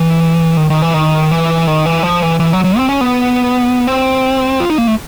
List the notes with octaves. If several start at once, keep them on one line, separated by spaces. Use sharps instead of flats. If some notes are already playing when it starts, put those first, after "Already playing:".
Already playing: E3
D#3
D#3
E3
D#3
E3
D#3
E3
F3
E3
E3
F#3
F#3
C4
C#4
B3
C4
F4
D#4
A#3
A3